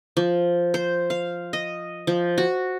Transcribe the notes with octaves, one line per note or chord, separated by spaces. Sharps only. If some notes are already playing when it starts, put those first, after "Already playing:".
F3
C5
F5
D#5
F3
F#4